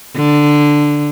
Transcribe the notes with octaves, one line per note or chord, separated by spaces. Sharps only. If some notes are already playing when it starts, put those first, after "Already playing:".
D3